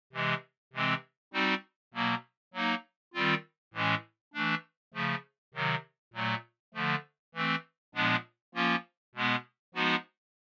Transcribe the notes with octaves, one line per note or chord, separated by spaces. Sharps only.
C3 E3 G#3
C3 E3 G#3 C4
G3 C4 D#4 F#4
B2 F#3 A#3
F#3 A#3 D#4
D#3 G3 C4 F4
A2 E3 G#3 C#4
E3 A3 D4
C#3 F3 A3
C3 D#3 F#3
A#2 F#3 A3
D3 F3 A3
E3 A3 C4
A#2 F3 G#3 B3 D4
F3 A#3 C#4 F4
B2 G#3 B3
F3 G#3 B3 D#4 F#4